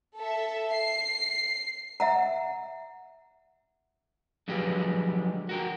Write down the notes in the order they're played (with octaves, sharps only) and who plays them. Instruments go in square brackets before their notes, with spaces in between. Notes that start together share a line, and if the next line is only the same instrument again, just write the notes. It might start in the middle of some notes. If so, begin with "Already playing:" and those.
[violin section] A4 E5
C7
[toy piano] E5 F#5 A#5
[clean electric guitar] D3 F3 F#3 G#3 G4 B4
F#4 A#4 G5